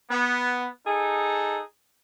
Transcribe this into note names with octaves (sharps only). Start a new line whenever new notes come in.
B3
D#4 G#4 A4